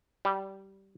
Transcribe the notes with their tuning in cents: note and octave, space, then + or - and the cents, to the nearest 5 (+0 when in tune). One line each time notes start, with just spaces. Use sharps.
G3 -15